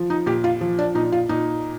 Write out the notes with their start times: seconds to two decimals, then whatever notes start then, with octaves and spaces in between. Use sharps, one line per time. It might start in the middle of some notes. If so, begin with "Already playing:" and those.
Already playing: F3
0.10 D#4
0.26 A#2 G4
0.44 F4
0.61 F3
0.79 D4
0.95 A#2 D#4
1.12 F4
1.29 A#2 D#4